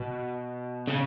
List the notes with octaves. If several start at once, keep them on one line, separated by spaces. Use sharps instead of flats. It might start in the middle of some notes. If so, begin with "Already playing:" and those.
Already playing: B2
C#3